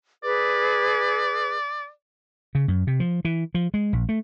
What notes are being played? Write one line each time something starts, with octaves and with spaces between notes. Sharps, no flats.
G#4 B4 D5
C#3
F#2
C3
F3
E3
F3
G#3
A#1
A3